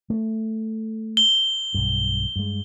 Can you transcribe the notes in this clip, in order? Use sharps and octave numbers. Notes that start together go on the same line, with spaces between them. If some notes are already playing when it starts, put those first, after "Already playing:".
A3
G7
B1 G2
G2 G#3